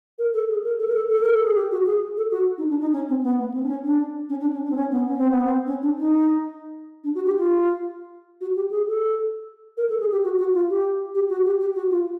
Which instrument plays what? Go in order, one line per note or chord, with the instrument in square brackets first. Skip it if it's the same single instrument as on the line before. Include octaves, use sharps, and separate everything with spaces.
[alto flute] A#4
A4
G#4
A#4
A4
A#4
A4
A4
A#4
A4
G#4
G4
F#4
G#4
A4
F#4
D#4
D4
D#4
C#4
C4
B3
A#3
C4
D4
C#4
D4
C#4
D4
C#4
D4
C4
C#4
B3
C#4
C4
B3
C4
C#4
D4
D#4
D4
F#4
G4
F4
F#4
G4
G#4
A4
A#4
A4
G#4
G4
F#4
F#4
F4
G4
G4
F#4
G4
G4
F#4
F4